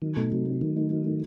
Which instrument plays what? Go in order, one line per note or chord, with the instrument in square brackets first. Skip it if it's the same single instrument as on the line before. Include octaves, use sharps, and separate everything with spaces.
[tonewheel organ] D#3 [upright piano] F#3
[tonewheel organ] B2 [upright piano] A3 D#4
[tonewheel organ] C3 [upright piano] F#3
[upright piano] A3 D#4
[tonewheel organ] D#3 [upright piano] F#3
[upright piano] A3 D#4
F#3
A3 D#4